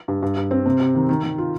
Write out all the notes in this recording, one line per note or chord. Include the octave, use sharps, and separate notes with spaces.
G2
G2
G2
C4
C3
C3
D#3
D#3
D#3
F4